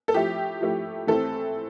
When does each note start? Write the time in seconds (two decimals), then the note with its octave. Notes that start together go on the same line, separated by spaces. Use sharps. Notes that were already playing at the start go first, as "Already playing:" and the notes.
0.08 A4
0.14 F3 A3 E4 G4
0.61 F3 A3 E4
1.07 E3 A3 C4 A4